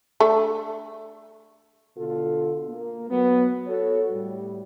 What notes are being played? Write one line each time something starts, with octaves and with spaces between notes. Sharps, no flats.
A3 D4 A4
B2 D3 F4 A4
A#3
F#3 B3
F#4 A4 C#5
A2 G3